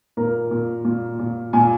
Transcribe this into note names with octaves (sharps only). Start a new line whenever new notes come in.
A#2 A#4
A#2
A#2
A#2
A#2 G#5